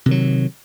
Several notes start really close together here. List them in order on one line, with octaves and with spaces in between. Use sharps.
C3 D#3 F#3